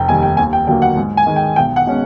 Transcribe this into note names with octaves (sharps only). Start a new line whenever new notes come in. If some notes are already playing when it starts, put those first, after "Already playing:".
Already playing: F1 G5
D#2 D#3 G3 G#5
G5
D#2 G#5
G5
D3 F#3 A#3 G5
F#5
G#2
G#5
D#3 G#3
G5
B1 G5
F#5
B2 G#3 C#4